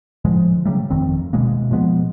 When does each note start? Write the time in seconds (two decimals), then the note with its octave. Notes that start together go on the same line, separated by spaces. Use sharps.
0.25 A2 D3 F3 G#3
0.66 C#3 F#3 G3 A3
0.90 G1 F2 D#3 C4
1.33 D2 B2 G#3 A#3
1.71 A#2 F3 G#3 B3